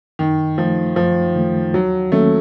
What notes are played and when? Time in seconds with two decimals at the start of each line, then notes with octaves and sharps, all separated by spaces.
0.19 F#2 D#3
0.58 D#3 F3 A3
0.96 F#2 F3
1.35 D#3 A3
1.74 D#2 F#3
2.12 D#3 F#3 A3 A#3 C#4